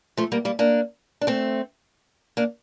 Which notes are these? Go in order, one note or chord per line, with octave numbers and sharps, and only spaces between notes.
F3 A3
G3 A#3
G3 A#3
A#3 D4
D4
A3 C4
A#3 D4